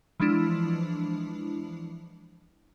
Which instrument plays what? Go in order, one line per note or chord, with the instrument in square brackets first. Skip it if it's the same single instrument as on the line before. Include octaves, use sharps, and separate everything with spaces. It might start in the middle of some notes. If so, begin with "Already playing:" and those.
[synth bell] E3 F3 G#3 D4 E4